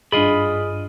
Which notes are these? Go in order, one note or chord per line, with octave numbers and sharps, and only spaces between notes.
G#1 G2 D4 F4 G#4 D#5 B5